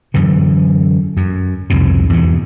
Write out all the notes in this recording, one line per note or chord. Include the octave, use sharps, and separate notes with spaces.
F#2 D3 E3
F#2
C2 F2 G#2 B2
E2 G#2 B2